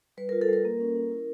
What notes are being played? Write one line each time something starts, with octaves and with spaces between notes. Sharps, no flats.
G3 B4
F4 A#4
A4
G3 A#4
A#3
C#4
C#4
E4